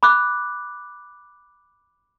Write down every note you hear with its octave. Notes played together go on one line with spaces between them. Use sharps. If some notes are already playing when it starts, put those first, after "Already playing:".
B5 D6 F#6